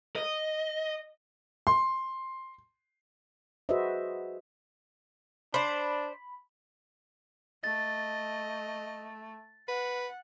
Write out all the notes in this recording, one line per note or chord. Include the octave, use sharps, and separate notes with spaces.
D#5
C6
F#4 G#4 B4 C5 D#5 E5
D4 C5 D5 B5
A3 D#5 A6
B4 F#5